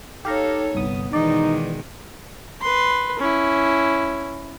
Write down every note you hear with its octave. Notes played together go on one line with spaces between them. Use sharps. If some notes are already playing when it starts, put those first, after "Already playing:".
D#4 G4 A4 C#5 F5 A#5
G1 C2 B3 D#6
B2 D#3 E3 G#3 D#4 D5
B4 C6
C#4 E4